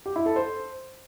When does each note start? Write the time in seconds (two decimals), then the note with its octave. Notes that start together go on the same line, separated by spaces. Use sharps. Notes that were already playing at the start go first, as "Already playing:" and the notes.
0.06 G4
0.16 E4
0.26 A4
0.36 C5